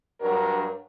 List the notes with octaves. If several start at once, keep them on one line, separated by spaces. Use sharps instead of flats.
G2 F#3 D4 A#4